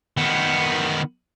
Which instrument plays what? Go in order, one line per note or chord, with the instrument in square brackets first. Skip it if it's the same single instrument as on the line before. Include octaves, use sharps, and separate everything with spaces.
[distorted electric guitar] D#3 B3